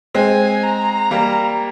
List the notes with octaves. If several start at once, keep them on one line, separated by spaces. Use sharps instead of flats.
G#3 C4 G#5
A#5
G3 A#3